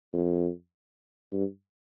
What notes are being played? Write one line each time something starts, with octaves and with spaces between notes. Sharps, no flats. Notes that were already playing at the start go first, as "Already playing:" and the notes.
F2
G2